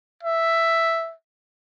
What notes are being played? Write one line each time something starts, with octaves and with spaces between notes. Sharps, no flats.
E5